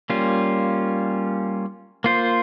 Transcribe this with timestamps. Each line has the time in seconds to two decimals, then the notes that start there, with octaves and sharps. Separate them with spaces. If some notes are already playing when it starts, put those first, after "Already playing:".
0.10 G3 A#3 C#4 F4
2.04 A#3 F4 C5